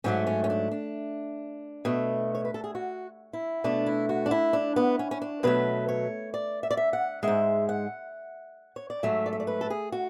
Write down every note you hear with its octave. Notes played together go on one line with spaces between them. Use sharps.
G#2 F#3 A3 C#4
C#4
C#4
D4
D4
B2 A3
C#5
B4
A4
G#4
F#4
E4
B2 A3 D4
E4
F#4
D4
E4
D4
B3
C#4
C#4
D4
B2 F#3 A3 B4
C#5
D5
E5
D5
E5
F#5
G#2 G#3 E5
F#5
C#5
D5
G#2 F#3 A3 E5
D5
E5
D5
B4
A4
G#4
F#4